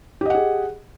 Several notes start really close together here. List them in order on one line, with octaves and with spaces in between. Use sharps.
G4 D#5 F#5 G#4